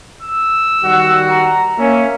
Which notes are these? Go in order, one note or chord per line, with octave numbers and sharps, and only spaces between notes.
E6
D#3 G3 F#4
A#5
A#3 C#4 E5